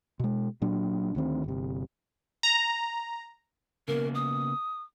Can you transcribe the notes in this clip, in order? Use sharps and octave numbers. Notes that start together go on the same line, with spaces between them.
B2 G#3
A#2 F#3 D4
D2 D#3 C4
G1 C3
A#5
C#3 A#3 B3 A#4
D#6